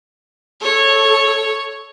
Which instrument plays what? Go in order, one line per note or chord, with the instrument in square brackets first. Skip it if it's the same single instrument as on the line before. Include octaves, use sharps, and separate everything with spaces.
[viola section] A4 [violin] C#5